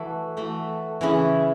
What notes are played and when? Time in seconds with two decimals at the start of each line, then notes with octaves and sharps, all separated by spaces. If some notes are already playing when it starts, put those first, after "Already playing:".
Already playing: E3 A3 F#4 A4
0.37 E3 A3 F#4 A4
1.01 C#3 E3 C#4 E4